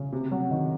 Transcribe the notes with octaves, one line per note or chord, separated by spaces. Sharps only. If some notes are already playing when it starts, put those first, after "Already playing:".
Already playing: C#3
C3
F#3
D#3